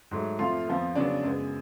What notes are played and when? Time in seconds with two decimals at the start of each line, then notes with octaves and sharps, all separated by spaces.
0.11 G#2 F#3 A3
0.39 F2 F3 A3 F4 F5
0.67 F2 F3 B3
0.95 C#3 F#3 B3 D4 D5
1.23 F#2 C#3 G#3 B3